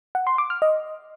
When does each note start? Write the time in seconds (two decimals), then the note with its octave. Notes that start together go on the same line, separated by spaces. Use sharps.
0.15 F#5
0.27 C6
0.38 D6
0.50 F6
0.62 D#5